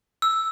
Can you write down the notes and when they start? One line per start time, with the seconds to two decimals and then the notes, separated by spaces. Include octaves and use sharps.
0.22 E6